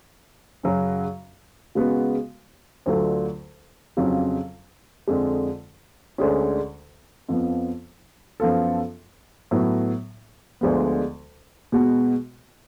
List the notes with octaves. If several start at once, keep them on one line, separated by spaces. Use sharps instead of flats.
F#2 C#3 F#3 C#4 F#4
C#3 G#3 B3 F#4
D2 D3 F#3 A3 F4
F2 C#3 F#3 C#4 F4
F2 D3 G#3
D2 D3 G#3 C#4 G#4
F2 F3 B3
F#2 F3 B3 F4 A4
A2 F#3 B3
D2 D3 F3 G#3 B3
B2 G#3 B3 F#4